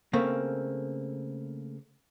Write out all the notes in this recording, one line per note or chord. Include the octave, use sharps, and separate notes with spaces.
C#3 A3 A#3 C4